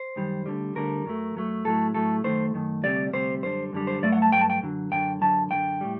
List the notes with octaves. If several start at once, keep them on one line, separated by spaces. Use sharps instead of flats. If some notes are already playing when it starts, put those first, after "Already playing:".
Already playing: C5
F#2 D#3 G3
D2 D3 G3
D2 D3 G3 A#4
F#2 F#3 A3
F#2 F#3 A3
A2 F#3 A3 A4
A2 F#3 A3 A4
F#2 D#3 A3 C5
F#2 D#3 A3
D2 C3 G3 D5
D2 C3 G3 C5
F#2 D3 G3 C5
F#2 D3 G3
C5
G2 F#3 A3 D5
F#5
A5
G2 F#3 A3 G5
A5
G5
F#2 D3 F#3
F#2 D3 F#3 G5
F#2 D3 F#3 A5
F#2 D3 F#3 G5
A2 G3